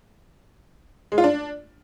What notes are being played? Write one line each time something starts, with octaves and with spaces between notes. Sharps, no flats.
G#3
F4
D4